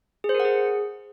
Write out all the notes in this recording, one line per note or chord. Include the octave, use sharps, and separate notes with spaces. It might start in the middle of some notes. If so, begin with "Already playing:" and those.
G#4
C5
A#4
F#5
G#4